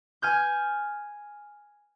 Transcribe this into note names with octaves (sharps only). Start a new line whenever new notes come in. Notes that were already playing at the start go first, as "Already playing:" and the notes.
G#5 F6 G6